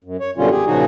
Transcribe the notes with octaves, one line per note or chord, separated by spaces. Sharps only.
F#2
C#5
F#2 B2 D3 G3 C#4 F4
G4 G#4
A#2 C#3 F3 D#4 F#4 G#4